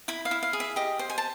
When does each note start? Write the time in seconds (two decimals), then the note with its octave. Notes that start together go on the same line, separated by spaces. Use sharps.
0.08 E4 B5
0.25 F5
0.31 E4
0.43 F5
0.53 G#4
0.60 E5
0.76 G4 D#5
0.99 C5
1.10 G#5
1.18 A5